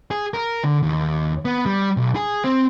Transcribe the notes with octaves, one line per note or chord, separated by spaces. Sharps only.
G#4
A#4
D3
D#2
B3
G3
B1
G#4
C4